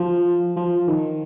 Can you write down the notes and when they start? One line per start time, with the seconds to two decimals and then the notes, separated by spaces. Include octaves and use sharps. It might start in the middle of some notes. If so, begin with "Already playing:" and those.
Already playing: F3
0.56 F3
0.88 D#3